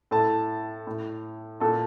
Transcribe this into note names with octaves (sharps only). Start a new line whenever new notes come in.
A2 A4 A5
A2
A#2 A4 A5